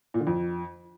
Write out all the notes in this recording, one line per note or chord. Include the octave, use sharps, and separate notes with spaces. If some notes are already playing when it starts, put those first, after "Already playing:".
A#2
D3
F2